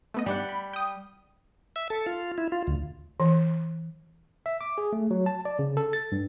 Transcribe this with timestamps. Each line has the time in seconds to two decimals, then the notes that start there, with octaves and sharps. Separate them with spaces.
0.14 A3 B3 D#5
0.26 G2 G3 G4 F#5
0.49 B5
0.73 G5 D#6
1.76 E5
1.90 A4
2.07 F4
2.38 E4
2.52 F4
2.67 D2
3.20 E3
4.46 E5
4.61 D6
4.78 G#4
4.93 A3
5.11 F#3
5.26 A5
5.45 D5
5.59 C#3
5.77 A4
5.93 A6
6.12 G2